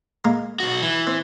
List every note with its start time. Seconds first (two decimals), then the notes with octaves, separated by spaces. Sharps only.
0.25 G#3 A#3 A#4
0.60 B1 F#4
0.82 E3
1.07 C4